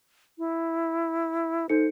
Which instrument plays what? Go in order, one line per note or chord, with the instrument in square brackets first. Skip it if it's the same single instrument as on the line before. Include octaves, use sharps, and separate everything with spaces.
[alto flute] E4
[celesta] D#4 A4 C#7 [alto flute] C5